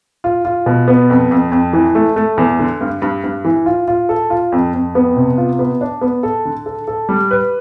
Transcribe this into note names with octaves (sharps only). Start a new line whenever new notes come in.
F4
F4
B2
B3
F2
F2
F2
E3
A3
A3
E2
D3
G2
G2
G2
E3
F4
F4
A4
F4
F2
F2
B3
C3
F4
B3
D4
B3
A4
D3
A4
A4
G3
B4